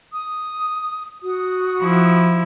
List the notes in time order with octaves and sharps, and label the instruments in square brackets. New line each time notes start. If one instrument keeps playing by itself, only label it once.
[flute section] D#6
F#4 D#6
[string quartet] F3 E4